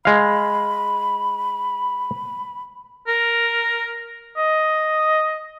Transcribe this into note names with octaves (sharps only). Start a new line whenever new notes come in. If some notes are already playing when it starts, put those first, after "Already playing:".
G#3 F5 B5
A#4
D#5